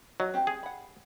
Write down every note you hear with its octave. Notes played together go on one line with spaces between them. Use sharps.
F#3 D#5
C4 G4
G#4
F#5 B5